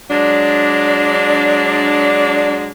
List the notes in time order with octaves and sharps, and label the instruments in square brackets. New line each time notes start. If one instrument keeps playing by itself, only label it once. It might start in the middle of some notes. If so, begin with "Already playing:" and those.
[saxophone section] F#3 G#3 D4